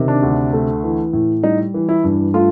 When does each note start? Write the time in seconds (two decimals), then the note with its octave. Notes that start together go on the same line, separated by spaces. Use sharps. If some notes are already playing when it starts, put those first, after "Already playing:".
Already playing: C3 D#3
0.08 D4
0.23 D2
0.53 A3
0.84 E3
1.13 A2
1.43 G3 D#4
1.74 E3
1.89 E4
2.04 G2
2.34 A3 F4